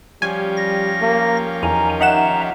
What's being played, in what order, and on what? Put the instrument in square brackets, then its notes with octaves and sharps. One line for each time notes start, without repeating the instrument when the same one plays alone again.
[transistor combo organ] F3 C#4 G4 [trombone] G3 [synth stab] G#5
[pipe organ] A#6
[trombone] A#3
[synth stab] E2 [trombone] D#3 [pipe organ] G#5 A#5
[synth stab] D#4 F#5 E7 [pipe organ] E5 A#5